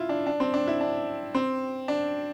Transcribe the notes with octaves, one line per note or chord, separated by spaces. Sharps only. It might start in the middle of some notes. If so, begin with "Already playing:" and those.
Already playing: E4 F4
D4
D4
C4
D4
E4
D4
C4
D4